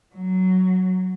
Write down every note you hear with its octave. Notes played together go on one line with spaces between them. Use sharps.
F#3